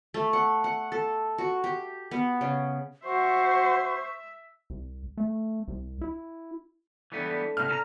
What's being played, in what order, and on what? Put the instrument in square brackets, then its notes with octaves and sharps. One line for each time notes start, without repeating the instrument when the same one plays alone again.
[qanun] A3
F#5
F#5
A4
F#4
G4
B3
C#3
[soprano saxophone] F#4 [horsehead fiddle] C5 [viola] E5 [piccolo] C#6
[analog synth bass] C2
A3
C2
E4
[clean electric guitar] E3 G3 B3 [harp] A3 D4
[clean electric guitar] A2 C3 [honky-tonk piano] F6
[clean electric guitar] A4 A#5